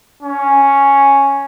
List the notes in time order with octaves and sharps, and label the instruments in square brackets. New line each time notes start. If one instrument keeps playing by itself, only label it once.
[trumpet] C#4